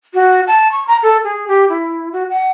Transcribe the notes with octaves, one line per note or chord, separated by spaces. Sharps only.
F#4
A5
C#6
A#5
A4
G#4
G4
E4
F#4
F#5